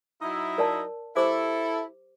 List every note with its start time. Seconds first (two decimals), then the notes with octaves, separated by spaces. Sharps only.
0.22 F#3 D#4 E4
0.58 A#4 D5 A5
1.16 E4 G4 A4 C5 D6